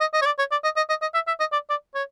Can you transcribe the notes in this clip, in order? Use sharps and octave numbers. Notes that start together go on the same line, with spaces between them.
D#5
D#5
C#5
D5
C#5
D5
D#5
D#5
D#5
D#5
E5
E5
D#5
D5
D5
C#5